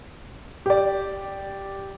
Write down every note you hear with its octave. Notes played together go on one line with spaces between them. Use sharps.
G4 D5